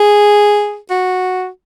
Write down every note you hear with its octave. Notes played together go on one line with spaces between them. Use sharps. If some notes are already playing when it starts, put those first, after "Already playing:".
Already playing: G#4
F#4